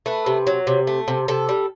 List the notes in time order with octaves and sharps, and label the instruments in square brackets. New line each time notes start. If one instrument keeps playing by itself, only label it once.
[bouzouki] A3 B4
C3
F#3
C3
A3
C3
C3 A4
G3